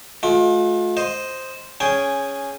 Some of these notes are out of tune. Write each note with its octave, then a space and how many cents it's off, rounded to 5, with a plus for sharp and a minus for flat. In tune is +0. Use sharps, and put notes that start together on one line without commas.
A3 -45 F4 +40
C5 +0 D#5 +0
C#4 +0 G#4 -5 G5 +0